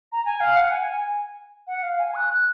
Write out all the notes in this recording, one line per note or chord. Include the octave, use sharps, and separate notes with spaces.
A#5
G#5
F5
F#5
G#5
G#5
F#5
F5
G#5
F#6
F#6